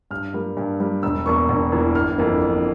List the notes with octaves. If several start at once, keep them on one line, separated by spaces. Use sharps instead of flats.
G2 F6
G3 A#3
G2
G3 A#3
E1 E6
E2 E3 A#3 C#6
E1
E2 E3 A#3
G1 F6
F2 E3 A#3
G1